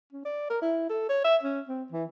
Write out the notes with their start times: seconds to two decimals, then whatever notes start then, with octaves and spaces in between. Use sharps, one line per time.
0.12 C#4
0.25 D5
0.50 A#4
0.62 E4
0.90 A4
1.09 C#5
1.25 E5
1.43 C#4
1.69 C4
1.92 E3